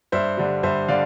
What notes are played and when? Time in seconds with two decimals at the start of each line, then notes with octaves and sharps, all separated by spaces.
0.12 G2 C5 E5
0.37 D3 G3
0.63 G2 C5 E5
0.88 D3 D5 F5